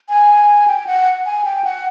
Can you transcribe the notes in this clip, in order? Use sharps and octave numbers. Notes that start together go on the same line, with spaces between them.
G#5
G5
F#5
G#5
G5
F#5